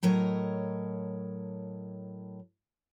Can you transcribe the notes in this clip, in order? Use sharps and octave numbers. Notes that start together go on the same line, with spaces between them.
A2 F#3 A#4 C#5 D#5